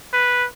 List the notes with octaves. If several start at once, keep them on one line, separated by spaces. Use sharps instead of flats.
B4